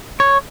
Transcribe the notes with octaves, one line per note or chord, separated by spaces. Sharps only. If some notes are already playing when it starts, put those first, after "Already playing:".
C#5